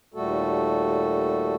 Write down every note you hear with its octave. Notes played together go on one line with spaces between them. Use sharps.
D#2 A#2 G3 A3 F#4 A4